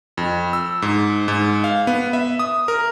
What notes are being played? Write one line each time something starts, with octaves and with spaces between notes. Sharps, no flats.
F2
E6
G#2
G#2
F5
B3
E5
D#6
A#4